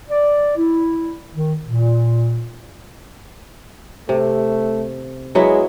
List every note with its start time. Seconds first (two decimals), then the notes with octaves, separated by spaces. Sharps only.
0.08 D5
0.57 E4
1.34 D#3
1.66 A#2
4.09 C3 A3
5.35 F#3 G#3 B3 E4